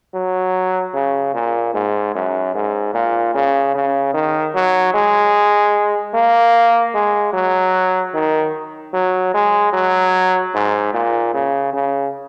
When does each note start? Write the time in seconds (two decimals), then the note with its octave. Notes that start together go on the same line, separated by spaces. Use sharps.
0.14 F#3
0.94 C#3
1.34 A#2
1.74 G#2
2.15 F#2
2.54 G#2
2.94 A#2
3.34 C#3
3.75 C#3
4.14 D#3
4.55 F#3
4.94 G#3
6.14 A#3
6.94 G#3
7.33 F#3
8.14 D#3
8.93 F#3
9.34 G#3
9.73 F#3
10.54 G#2
10.94 A#2
11.34 C#3
11.73 C#3